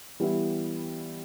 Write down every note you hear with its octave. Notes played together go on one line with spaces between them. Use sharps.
E3 G3 B3 E4